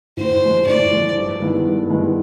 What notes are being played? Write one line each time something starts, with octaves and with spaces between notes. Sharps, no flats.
A2 C5
F3 G#3
A2 D5
F3 G#3
G2
D#3 G#3 B3 E4
G2
D#3 G#3 B3 E4